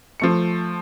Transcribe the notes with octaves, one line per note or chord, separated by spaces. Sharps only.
F3 A3 C#7